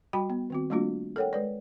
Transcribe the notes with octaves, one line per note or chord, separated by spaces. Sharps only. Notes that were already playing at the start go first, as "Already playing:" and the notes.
G3 F#4 G5 B5
B3
D#3 C4 F#4
G3 A3 A#3 D4 F4 F#4
A4 A#4 C#5 F#5 G5
G#3 B4 D5